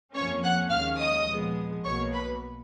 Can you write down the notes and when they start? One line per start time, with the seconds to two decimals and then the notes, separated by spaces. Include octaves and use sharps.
0.14 F2 F3 A#3 C#4 C#5 C#6
0.43 F#5 F#6
0.71 D#2 D#3 G#3 C#4 F5 F6
1.00 D#5 D#6
1.28 A#2 F3 G#3 B3
1.84 B1 B2 A#3 C#5 C#6
2.13 B4 B5